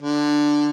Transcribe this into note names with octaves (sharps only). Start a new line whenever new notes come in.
D3